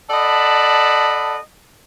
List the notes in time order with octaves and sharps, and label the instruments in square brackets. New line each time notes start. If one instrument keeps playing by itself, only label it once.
[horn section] A4 D5 D#5 F#5 A5 B5